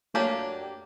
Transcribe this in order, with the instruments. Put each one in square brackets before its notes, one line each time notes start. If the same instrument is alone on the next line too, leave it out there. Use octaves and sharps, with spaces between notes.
[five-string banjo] F#3 A#3 D4 G4 [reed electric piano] A3